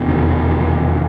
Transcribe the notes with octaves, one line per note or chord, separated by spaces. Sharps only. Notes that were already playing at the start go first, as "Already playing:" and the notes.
Already playing: F1 E2 B2
D#3